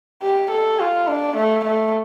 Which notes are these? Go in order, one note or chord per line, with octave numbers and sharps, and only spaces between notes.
G4
A4
F4
D4
A3
A3